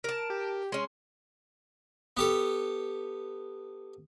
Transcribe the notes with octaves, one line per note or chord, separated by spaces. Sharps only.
A#4 A5
G4
G#3 C#4 C6
B3 G4 A4